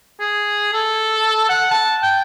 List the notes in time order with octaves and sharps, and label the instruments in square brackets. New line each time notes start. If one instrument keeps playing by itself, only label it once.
[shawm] G#4
A4
F#5
A5
G5